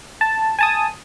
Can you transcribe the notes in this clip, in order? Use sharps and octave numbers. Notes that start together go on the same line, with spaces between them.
A5
G#5 A5 D#6